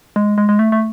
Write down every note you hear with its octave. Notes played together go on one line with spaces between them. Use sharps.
G#3
G#3
G#3
A3
A3